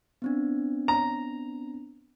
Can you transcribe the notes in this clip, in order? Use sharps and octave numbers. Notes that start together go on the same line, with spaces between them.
B3 C4 D4
A#5